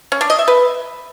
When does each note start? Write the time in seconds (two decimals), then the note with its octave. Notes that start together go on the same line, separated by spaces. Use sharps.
0.12 C#4
0.21 D4
0.30 D#5
0.39 E5
0.48 B4